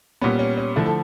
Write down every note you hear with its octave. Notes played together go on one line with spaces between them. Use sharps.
A#2 G3 B3 C#4
C#4
C#4
D3 F3 A3 E4
A4